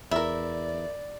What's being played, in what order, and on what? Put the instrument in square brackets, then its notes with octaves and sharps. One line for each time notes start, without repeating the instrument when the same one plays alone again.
[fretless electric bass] E2 [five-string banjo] E4 A#4 [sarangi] D5 [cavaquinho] E5